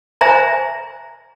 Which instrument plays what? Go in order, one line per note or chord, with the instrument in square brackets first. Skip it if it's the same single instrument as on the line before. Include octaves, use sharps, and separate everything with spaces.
[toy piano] C5 E5 G#5 A#5